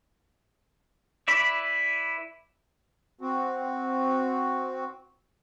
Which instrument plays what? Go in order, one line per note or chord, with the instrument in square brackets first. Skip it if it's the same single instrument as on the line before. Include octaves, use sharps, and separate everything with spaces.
[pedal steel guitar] E4 B4 D5 E5
[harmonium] C4 F#4